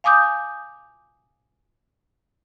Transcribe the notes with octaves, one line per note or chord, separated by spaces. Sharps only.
F5 G#5 D6 D#6 G6